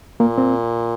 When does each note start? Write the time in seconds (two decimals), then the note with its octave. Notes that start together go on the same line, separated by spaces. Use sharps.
0.20 A#2 A#3
0.38 C4